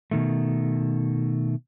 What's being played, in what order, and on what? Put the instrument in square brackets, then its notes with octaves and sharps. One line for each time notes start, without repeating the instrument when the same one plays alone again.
[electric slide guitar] B2 D#3 A3